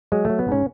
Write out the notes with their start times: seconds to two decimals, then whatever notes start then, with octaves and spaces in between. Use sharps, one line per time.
0.12 F#3 G#3
0.25 F#3 A3
0.39 B3
0.48 G#2 C#4